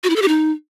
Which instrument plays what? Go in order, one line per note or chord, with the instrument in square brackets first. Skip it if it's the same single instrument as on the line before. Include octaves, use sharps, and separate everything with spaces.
[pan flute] F#4
E4
A4
G4
D#4